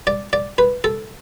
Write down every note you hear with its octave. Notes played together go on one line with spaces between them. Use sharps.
D5
D5
B4
A4